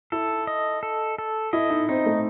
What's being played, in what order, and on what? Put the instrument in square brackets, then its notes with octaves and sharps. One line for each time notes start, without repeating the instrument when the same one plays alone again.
[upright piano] E4 [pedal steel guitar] A4
[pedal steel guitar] D#5
A4
A4
[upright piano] E4 [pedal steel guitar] D#5
[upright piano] D#4
[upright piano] C4 [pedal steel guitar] D#4
[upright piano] A3